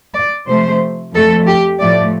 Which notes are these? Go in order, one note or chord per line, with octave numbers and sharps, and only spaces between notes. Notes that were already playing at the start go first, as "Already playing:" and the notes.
D5
C3 F3 A3 C5
F2 F3 A3 A4
G4
A2 F3 A3 D5